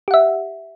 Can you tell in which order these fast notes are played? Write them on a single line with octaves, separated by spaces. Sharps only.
G4 F#5 E5